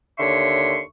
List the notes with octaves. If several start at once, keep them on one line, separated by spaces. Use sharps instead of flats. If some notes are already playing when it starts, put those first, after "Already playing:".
D#2 D3 C#5 E5 C6 C#6